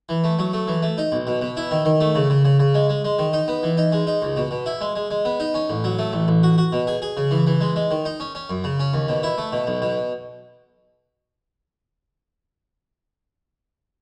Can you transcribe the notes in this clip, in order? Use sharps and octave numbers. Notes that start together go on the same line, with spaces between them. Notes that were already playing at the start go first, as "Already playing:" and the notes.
E3
A3
F#3
A3
E3
A3
D#4
B1
B2
B2
E4
D#3
D#3
A3
C#3
C#3
C#3
C#3
G#3
G#3
G#3
D#3
D#4
B3
E3
D#4
G#3
D#4
C#2
B2
B2
E4
G#3
G#3
G#3
B3
D#4
C#4
A1
F#3
A3
A1
A1
F#4
F#4
B2
G#4
G#4
C#3
E3
E3
G#3
G#3
D#3
D#4
C#4
C#4
F#2
C#3
C#4
D#2
B2
E4
A3
B2
B1
B2